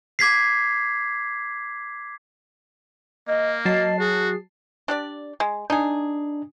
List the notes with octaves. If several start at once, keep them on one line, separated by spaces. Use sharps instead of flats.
D6 G#6 B6 C7
A#3 D#5
F#3 D#5 A5 C7
F#4 G#4
D4 G4 D5
G#3
D4 D#4 G#4